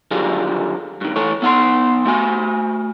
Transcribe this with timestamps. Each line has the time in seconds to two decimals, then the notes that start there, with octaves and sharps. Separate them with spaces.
0.11 D3 D#3 F#3 G3 F4 G#4
1.01 G2 D#3
1.16 E3 A3 A4 C#5
1.42 B3 D#4 F#5 G#5 C6
2.06 A3 F#4 G#5